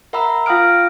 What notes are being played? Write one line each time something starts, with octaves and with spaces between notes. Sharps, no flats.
A#4 E5 F#5 A#5 B5 E6
F4 F5 G5 D#6 F6 D7